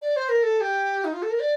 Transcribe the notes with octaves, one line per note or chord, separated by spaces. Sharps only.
D5
C5
A#4
A4
G4
D#4
F4
A4
A#4
D5